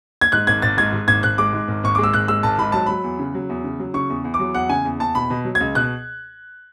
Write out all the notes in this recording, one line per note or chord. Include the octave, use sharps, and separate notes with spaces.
G#6
G#2 F#6
G#1 G#6
G#1 A6
G#2 G#6
G#2
G#1 G#6
G#1 F#6
G#3 D6
G#2
G#1
G#1 C#6
G#3 D6
E6
G#1 F#6
G#3 E6
G#1 A5
G#2 B5
F#3 A5
F#3 B5
E2
C#3
F#3
E2
C#3
F#3
C#3 C#6
E2
E2
D6
F#3
E2 F#5
C#3 G#5
E2
E2 A5
B2 B5
B2
F#3
G#6
C#2
B2 F#6